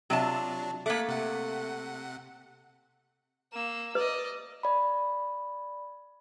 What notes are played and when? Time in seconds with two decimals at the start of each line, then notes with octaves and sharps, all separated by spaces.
0.10 C3 F#3 D4 F4 A5
0.86 A3 A#3 D6 F#6 B6
1.08 C3 F#5
3.53 A#3 E6
3.95 B4 D5 D#5
4.63 D5 B5